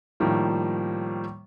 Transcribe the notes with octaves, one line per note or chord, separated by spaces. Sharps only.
A2 D#3 F3 G3 A#3